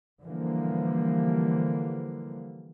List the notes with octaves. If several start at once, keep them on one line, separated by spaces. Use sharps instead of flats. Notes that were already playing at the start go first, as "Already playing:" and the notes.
D3 E3 F3 G3 A#3